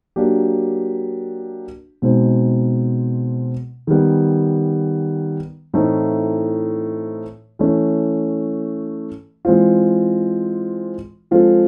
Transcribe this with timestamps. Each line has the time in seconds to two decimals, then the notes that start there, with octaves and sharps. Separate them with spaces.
0.16 F#3 A#3 D4 G4
2.02 B2 G#3 C4 D#4
3.87 D#3 G3 B3
5.74 A2 E3 A3 C4 D#4
7.59 E3 A3 C#4
9.45 E3 G#3 C4 F4
11.31 F3 G#3 C4 F4 A4